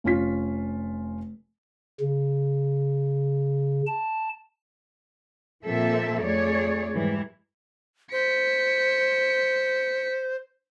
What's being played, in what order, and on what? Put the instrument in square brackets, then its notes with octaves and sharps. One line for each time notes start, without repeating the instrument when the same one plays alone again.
[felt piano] F1 C#4 F4 B6
[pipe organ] C#3
A5
[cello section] A#2 F3 A#3 C4 A4 E5
F2 A3 G#4 C#5 D5
G#2 E3 G3
[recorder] C5 [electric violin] B6 C#7